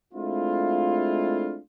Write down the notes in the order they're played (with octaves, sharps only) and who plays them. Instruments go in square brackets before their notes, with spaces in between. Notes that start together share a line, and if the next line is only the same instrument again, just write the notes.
[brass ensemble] G#3 A3 C4 D4 E4 F4